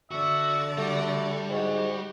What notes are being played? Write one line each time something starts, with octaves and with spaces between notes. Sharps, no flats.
D3 F#4 D5 E5
G3 A3 F#4
G#2 F#4